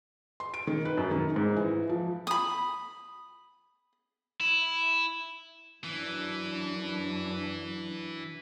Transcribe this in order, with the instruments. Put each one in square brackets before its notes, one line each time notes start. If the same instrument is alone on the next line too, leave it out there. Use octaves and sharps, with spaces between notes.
[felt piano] C6
D7
D#3
B4
F#2
D#3
G#2
E3
F3
[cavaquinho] B5 D#6
[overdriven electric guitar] E4
[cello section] F#2 D4 [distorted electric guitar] E3